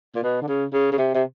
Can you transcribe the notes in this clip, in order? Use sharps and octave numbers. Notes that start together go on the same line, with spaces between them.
A#2
B2
D3
C#3
C#3
C#3
C3
C3